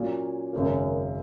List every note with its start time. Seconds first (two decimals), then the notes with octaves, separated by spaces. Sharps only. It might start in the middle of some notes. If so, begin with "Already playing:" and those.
Already playing: A#2 F#3 A#3 C#4
0.53 G#1 F#2 C#3 A#3